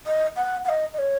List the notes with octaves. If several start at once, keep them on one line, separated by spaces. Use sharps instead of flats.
D#5
F#5
F#5
D#5
D#5
C#5